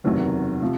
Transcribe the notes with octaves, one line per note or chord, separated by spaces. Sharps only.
F#1 E2 C3 D#3 F#3
C3 F3